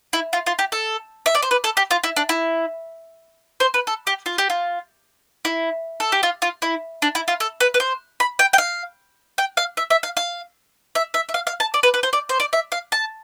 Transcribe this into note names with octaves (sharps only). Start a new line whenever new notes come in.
E4
F4
F4
G4
A4
E5
D5
C5
B4
A4
G4
F4
E4
D4
E4
C5
B4
A4
G4
F4
G4
F4
E4
A4
G4
F4
F4
E4
D4
E4
F4
A4
B4
B4
C5
B5
G5
G5
F5
G5
F5
E5
E5
F5
F5
E5
E5
E5
F5
F5
A5
D5
B4
B4
C5
D5
C5
D5
E5
F5
A5